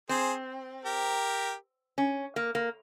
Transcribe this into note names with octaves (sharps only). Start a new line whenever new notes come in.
C4 G#4 C5
G4 A#4
C#4
A#3
A#3